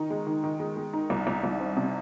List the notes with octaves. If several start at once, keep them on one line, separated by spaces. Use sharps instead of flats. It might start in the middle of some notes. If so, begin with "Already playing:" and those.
Already playing: D#3 D#4
G#3
D#3
D#3
G#3
G#3
D#4
C2
C2
C2
C4
C3